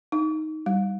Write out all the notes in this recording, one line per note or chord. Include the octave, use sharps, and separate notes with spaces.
D#4
G3